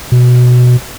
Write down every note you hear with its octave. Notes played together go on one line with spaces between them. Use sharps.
B2